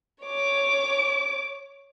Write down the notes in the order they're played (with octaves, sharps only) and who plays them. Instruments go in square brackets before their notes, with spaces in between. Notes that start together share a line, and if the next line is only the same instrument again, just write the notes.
[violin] C#5 D6